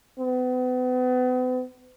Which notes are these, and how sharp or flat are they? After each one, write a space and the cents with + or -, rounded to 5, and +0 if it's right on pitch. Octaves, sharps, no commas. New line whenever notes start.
B3 +40